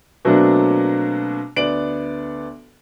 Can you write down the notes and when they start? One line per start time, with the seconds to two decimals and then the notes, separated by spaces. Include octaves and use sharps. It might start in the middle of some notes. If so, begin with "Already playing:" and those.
0.25 B2 F#3 A3 A#3 C4 D4
1.56 D2 B3 D5 D7 F#7